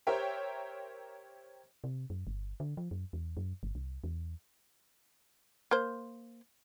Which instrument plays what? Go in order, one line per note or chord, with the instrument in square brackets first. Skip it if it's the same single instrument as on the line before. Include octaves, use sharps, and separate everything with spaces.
[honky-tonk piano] G4 A#4 C5 C#5 E5 G5
[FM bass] C3
F#2
G1
D3
F3
F#2
E2
F#2
G1
C2
E2
[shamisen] A#3 C5